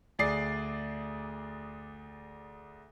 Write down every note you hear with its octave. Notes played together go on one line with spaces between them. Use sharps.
D2 G#4 D5 C7